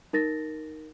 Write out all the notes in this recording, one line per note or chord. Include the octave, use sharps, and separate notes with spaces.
D#4 A#4 A6 A#6